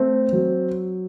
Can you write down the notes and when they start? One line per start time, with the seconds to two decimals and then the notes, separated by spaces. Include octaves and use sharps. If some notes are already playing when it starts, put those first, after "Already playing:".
Already playing: A3 C4
0.33 F#3